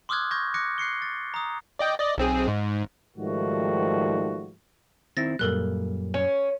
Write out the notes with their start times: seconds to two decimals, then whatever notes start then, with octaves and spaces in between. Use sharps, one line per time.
0.09 C6 D6 D#6 F6 F#6 G#6
0.31 C#6 G6 G#6 A#6
0.54 D6 F#6 A#6 C#7
0.78 F#6 C7 C#7 G7
1.02 A6
1.34 A#5 D#6
1.79 D5 D#5 G5
1.99 D5 D#5
2.18 B1 C4 G#4
2.48 G#2
3.17 G#2 D#3 F3 G3 A3 F#4
5.17 D#3 C4 E4 A6 A#6
5.39 F#2 A#2 G3 A4 A#4 F#6
6.14 C#4